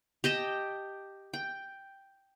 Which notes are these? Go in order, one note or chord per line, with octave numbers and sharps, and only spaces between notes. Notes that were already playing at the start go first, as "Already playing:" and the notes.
G4 D#5 G5 A5
G5